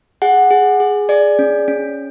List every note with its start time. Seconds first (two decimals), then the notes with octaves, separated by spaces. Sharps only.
0.22 G#4 F#5
0.50 G#4
0.80 G#4
1.09 G#4 D5
1.39 C#4
1.68 C#4